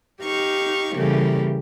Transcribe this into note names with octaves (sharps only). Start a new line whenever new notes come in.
D#4 G4 F5 C#6
C#3 E3 G3 A3 A#3 G4